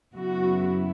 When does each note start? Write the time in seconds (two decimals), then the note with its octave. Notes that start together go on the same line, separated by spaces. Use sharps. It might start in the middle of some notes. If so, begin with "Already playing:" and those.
0.14 F#2 C#3 F#3 B3 E4 F#4